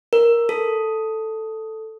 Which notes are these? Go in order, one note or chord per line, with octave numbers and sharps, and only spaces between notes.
A#4
A4